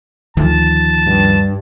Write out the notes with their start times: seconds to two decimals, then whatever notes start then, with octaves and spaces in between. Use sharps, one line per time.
0.37 D2 D#3 F3 A5
1.06 G2